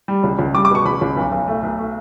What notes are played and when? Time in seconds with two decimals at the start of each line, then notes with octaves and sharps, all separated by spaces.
0.08 G3
0.23 C#2
0.39 C#2
0.54 G3 D6
0.65 D6
0.70 B2 C#6
0.85 C#2 B5
1.01 C#2
1.17 B1
1.32 B1
1.48 A3
1.63 B1
1.79 A3